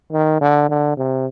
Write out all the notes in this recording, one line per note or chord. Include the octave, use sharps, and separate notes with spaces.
D#3
D3
D3
C3